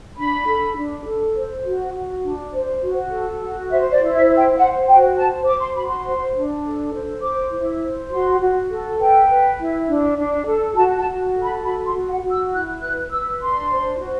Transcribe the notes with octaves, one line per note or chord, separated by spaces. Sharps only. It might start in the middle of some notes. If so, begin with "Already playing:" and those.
D4 B5
A4
D4
A4
C5
F#4
F#4
D4
C5
F#4
A4
F#4
C5 E5
D5
E4
E5
C5
G5
C5 F#5
F#4 G5
C5 A5
C5 D6
C6
F#4 B5
C6
C5
D4
A4
C5
C5 D6
E4
C5
F#4 C6
F#4
A4
B4 G5
B4
E4
D4
D4
A4
F#4 A5
A5
F#4
A4
B5
F#4 B5
C6
F#4
F#5
F#4
E6
E4 F#6
B4 F#6
B4 E6
D4 C6
C5
F#4